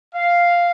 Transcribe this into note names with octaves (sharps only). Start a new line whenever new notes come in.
F5